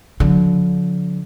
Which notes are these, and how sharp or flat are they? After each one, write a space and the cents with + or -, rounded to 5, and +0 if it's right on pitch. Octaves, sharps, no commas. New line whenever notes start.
D3 -30 F3 +40